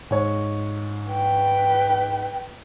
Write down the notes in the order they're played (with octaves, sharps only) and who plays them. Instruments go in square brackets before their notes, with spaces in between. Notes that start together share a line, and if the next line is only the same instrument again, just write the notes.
[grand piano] G#2 C#5
[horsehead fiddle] B4 G5